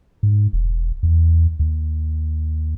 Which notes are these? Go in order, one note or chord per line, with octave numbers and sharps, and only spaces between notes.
G#2
E1
E2
D#2